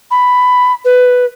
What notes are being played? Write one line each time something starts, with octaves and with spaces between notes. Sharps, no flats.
B5
B4